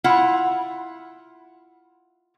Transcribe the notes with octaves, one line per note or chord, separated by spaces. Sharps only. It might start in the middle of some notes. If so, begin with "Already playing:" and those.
E4 F4 F#5